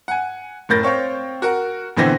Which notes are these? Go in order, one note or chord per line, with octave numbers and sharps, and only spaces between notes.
F#5 G#5
F#1 A2 A#4 G6 A6 A#6
C4 C#5 F5 G5
F#4 A#4 F#5
A#1 D3 E3 B3 C4 A#6